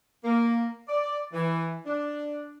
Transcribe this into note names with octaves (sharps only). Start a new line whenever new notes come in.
A#3
D5
E3
D4